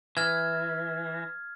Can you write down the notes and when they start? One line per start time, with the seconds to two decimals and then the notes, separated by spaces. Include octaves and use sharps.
0.17 E3 F6 G#6